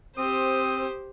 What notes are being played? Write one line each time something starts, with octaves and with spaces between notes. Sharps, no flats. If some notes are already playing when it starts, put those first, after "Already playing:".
C4 G4 C5 D#6